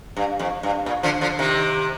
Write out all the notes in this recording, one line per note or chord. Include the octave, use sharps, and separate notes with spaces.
G2
F2
G2
A#2
D3 F3
D3 F3
C3 D#3